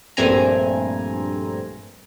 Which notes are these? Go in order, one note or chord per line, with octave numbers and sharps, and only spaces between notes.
A#1 G2 A3 C4 G#5 A#5